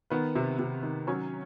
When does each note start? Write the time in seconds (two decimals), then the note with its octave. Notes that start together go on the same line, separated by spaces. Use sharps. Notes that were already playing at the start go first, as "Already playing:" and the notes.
0.10 D#3 B3 B4
0.36 C3
0.59 C3
0.83 D#3
1.07 F#3 C#4 C#5